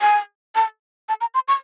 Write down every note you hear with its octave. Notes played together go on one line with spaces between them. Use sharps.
G#5
A5
A5
A#5
C6
C#6